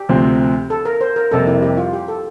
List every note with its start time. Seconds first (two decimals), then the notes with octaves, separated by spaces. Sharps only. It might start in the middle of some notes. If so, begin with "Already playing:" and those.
Already playing: G4
0.09 D2 C3 F3 C4
0.70 A4
0.85 A#4
1.01 C5
1.16 A#4
1.31 F2 C3 G3 A#3 A4
1.47 E4
1.62 G4
1.77 F4
1.93 G4
2.08 A4